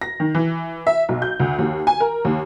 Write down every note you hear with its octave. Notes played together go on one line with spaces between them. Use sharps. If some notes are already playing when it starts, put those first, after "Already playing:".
A#6
D#3
E3
E5
B1
G6
D2
D#2
G#5
A#4
D#2